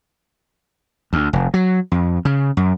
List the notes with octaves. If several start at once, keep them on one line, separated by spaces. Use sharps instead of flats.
D2
F1
F#3
F2
C#3
F#2